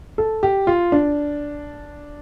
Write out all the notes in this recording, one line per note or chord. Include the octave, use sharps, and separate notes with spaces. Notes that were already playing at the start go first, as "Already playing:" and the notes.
A4
G4
F4
D4